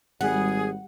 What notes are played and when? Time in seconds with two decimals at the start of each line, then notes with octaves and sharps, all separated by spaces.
0.21 G#1 G3 G#4 F#5